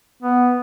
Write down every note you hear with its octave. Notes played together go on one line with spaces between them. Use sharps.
B3